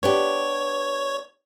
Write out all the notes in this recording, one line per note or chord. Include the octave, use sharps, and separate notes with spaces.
B3 D4 G4 C#5